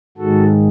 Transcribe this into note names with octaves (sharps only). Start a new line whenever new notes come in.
G#2 D#3 G#3 F#4 A4